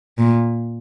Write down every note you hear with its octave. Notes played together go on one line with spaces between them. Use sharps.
A#2